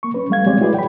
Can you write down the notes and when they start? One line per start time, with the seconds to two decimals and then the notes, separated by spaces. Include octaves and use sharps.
0.03 A#3 C#6
0.14 C#4 B4
0.30 G3 A3 F5 G#6
0.47 G#3 C4 G4 G#4 C#5 D5
0.61 E4 F#4 G#4 B4 D5
0.75 G5 B5